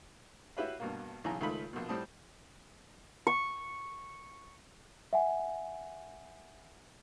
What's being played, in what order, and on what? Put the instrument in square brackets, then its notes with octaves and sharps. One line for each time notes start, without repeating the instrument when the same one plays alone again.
[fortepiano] E4 F#4 G4 B4 C#5 F5
G2 B2 A#3
B1 C#3 E3 G#5 A#5
C#2 D#3 A3 F5 B5
A#1 B2
A2 G3 C4 A5 D#6
[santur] C#6
[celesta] E5 F#5 G#5